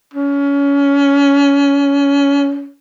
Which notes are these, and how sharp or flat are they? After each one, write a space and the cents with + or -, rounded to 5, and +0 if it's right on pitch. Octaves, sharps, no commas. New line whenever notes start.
C#4 +25